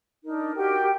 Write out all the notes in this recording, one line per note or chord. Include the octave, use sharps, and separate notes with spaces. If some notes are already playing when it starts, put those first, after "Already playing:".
D4 D#4 A#4
F#4 G4 A#4 G5